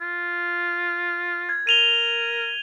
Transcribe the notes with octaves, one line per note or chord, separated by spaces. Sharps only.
F4
G#6
A#4 D#7 F7 G7